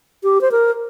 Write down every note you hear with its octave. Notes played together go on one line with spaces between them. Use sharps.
G4
C5
A#4